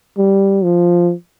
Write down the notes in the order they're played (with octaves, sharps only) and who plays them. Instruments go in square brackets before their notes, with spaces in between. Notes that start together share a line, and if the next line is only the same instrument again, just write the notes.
[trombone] G3
F3